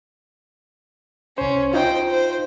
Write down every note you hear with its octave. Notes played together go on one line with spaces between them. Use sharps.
C2 C#4 C5
D#4 F4 C5 G5
C5